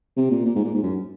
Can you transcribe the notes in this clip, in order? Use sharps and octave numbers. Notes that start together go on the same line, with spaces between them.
C3
A#2
A#2
G#2
A#2
G#2
F#2